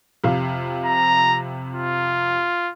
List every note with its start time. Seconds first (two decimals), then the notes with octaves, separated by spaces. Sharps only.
0.24 F2 C3 F5
0.85 A#5
1.76 F4